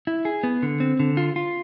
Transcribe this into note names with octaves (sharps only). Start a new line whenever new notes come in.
E4
G#4
B3
D3
C4
D3
F4
F4